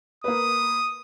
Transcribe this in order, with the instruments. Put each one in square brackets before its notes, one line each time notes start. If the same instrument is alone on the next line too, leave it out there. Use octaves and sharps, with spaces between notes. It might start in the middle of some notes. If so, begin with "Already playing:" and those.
[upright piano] A#3 B4 [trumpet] D#6